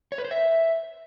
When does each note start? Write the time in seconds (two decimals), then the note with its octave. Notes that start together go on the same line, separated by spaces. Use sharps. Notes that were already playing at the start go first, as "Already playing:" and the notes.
0.12 C#5
0.18 B4
0.25 C5
0.31 E5